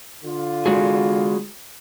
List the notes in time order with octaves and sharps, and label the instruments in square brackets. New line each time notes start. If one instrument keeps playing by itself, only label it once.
[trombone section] D3 F4
[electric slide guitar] G#3 F#4 G#4